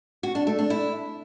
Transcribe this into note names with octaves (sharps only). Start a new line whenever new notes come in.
F#4
D4
A3
D4
E4